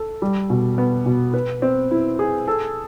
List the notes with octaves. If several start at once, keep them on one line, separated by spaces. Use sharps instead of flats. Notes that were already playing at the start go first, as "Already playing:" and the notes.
Already playing: A4
G3
B2
B3
B2
B4
C4
E4
G#4
A4